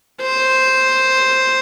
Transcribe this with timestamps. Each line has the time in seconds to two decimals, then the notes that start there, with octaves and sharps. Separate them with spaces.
0.21 C5